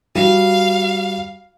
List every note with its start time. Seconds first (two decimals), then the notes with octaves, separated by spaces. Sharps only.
0.15 G3 F#4 F5